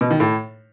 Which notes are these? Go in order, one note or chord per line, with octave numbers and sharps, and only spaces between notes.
B2
D#3
A2